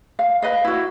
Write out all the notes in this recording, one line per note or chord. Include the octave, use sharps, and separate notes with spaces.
F5
B4 D#5 F5
E4 F#4